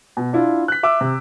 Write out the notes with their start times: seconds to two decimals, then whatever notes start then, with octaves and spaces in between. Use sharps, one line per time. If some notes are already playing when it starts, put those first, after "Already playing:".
0.17 B2
0.33 D4 E4 F4
0.68 F#6 B6
0.83 E5 D6 E6
1.01 C3